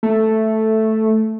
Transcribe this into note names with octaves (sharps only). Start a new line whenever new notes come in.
A3